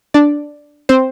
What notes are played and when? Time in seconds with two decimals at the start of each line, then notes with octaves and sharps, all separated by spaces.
0.14 D4 D5
0.89 C4 C5